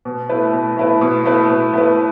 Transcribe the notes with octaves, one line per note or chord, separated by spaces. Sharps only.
B2
A3 E4 B4
B2
A3 E4 B4
B2
A3 E4 B4
B2
A3 E4 B4